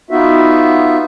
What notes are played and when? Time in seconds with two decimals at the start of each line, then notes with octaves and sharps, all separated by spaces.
0.10 B3 D#4 F4 F#4 E5